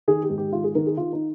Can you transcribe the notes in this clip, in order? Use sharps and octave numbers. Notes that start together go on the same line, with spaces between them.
D#3 G#4
G4
G#2
G4
D#3 F4
G#4
D#3 A#4
G#4
D#3 F4
D#4